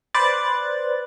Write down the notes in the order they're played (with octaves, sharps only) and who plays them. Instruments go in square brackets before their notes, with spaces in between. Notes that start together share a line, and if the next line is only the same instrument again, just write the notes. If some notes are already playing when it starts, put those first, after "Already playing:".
[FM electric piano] B4 C5 D5 F#6 A6